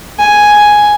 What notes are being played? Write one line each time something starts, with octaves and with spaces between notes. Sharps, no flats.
G#5